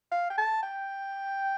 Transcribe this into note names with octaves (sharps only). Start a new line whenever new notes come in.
F5
G5
A5
G5